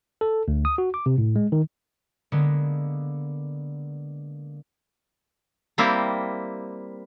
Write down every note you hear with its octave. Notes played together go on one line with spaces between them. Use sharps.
A4
D2
D#6
F#4
D6
C3
A2
G#3
D#3
D3 G#3 A#3 B3
G3 A#3 C4 E4